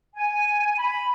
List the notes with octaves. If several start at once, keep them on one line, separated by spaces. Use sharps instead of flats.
G#5
B5